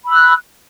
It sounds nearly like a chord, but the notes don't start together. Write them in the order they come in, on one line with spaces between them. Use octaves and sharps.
B5 E6 F#6